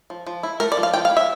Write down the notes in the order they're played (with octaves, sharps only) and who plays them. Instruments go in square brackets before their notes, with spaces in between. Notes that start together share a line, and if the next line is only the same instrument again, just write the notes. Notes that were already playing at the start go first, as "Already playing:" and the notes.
[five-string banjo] F3
F3
E4
A3 A#4
D5
F3
F5
F3 G5
F5
E4
E5